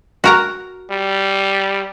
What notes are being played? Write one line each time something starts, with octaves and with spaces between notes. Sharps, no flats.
F#4 A#4 A#5
G3